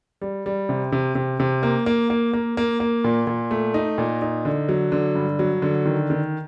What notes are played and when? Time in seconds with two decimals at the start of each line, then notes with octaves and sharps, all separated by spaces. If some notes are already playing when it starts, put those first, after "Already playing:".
0.21 G3
0.46 G3
0.69 C3
0.92 C3
1.15 C3
1.40 C3
1.63 A#3
1.86 A#3
2.10 A#3
2.33 A#3
2.57 A#3
2.80 A#3
3.04 A#2
3.27 A#2
3.51 A3
3.74 D#4
3.98 A#2
4.22 D#4
4.45 D3
4.69 F#3
4.92 D3
5.15 G2
5.39 F#3
5.62 D3
5.86 D#3
6.10 D#3